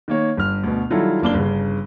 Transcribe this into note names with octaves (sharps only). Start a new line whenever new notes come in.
D#3 A#3 C#5
G1 F6
D2 B2
D#3 F#3 G3 E4 F4 A4
F#1 A#3 D4 G7
G1 C#3